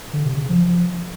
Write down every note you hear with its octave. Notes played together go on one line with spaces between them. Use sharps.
D3
C3
C#3
F3